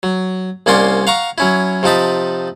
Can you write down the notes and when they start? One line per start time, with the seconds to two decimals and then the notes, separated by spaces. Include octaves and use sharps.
0.03 F#3
0.66 C2 A#3 C#4 D5 F#5 C6
1.07 F5 F#5 A#5 C#6
1.38 F#3 C#4 E4
1.83 C3 F3 D#4 A5 B5